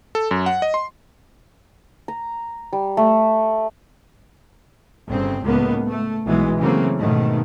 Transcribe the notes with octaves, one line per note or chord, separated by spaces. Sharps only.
A4
F#2
F#5
D#5
C6
A#5
G3
A3
G1 C#3 C4
C#2 A2 A#3 B3
A3
B1 B2 E3 G#3
C#3 E3 F#3 A3 A#3 C4
G#2 B2 D#3 A3